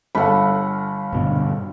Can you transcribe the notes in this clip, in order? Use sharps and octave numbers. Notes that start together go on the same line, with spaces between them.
G1 A4 F5 F#5 B5
G2 B2 D3